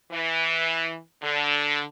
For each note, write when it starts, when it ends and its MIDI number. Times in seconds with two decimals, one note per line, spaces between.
0.12 0.97 52
1.22 1.81 50